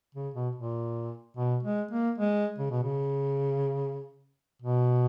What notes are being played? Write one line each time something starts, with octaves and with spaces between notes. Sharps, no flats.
C#3
B2
A#2
B2
G#3
A#3
G#3
C#3
B2
C#3
B2